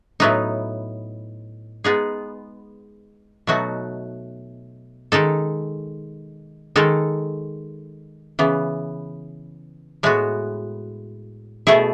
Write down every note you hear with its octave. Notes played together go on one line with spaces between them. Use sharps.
A2 F#3 B3 D#4
G#3 B3 D#4 G#4
B2 F#3 A3 D#4 F#4
D#3 G#3 D#4 A4
D#3 G#3 D#4 A4
C#3 E3 B3
A2 G#3 B3 F#4
B2 A3 E4 G#4